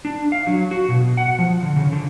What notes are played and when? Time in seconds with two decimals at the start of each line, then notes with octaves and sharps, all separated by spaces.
0.05 D4
0.32 F5
0.47 F#3
0.71 F#4
0.89 B2
1.17 F#5
1.39 F3
1.63 D3
1.76 C#3
1.92 D3